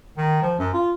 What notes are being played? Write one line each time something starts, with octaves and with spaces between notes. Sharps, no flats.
D#3
F3
F#2
F4